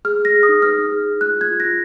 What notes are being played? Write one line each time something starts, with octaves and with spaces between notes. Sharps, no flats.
G#4 F6
G#4
A#6
G#4
D#6
D#4
B4 F6
D#4
G#4
G#4
F4 F#6
F4 G#6
F4
A#6
F4